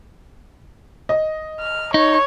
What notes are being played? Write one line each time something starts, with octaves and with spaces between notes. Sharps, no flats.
D#5
F6
D#4 C#5